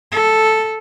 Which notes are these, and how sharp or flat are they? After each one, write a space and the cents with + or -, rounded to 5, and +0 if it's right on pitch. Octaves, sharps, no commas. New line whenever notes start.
A4 -5